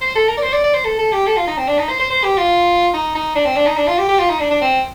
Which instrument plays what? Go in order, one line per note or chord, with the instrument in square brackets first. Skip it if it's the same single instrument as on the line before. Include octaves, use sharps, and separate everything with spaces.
[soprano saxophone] C5
A4
A#4
D5
C5
D5
D5
C5
A4
A4
G4
A4
F4
D#4
C4
D4
D#4
C5
C5
C5
G4
F4
D#4
D#4
D4
C4
D4
D#4
D4
F4
G4
G4
F4
D#4
D4
D4
C4